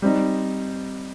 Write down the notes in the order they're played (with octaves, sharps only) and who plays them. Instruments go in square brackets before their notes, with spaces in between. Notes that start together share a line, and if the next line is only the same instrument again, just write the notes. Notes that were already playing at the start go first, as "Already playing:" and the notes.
[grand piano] G3 C4 D#4